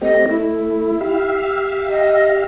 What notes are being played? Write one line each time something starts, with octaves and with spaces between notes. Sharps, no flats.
A3 C4 G4 D#5
A3 E4
G4 E5 F5
D#5